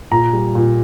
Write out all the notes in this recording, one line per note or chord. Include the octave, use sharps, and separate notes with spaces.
A#2 A#5
G3
A#2